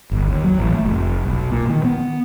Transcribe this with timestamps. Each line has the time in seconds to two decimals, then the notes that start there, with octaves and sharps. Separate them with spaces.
0.11 G1
0.28 D#2
0.44 F#3
0.59 A1
0.73 A3
0.85 F1
1.25 B1
1.52 A#2
1.70 D#3
1.85 B3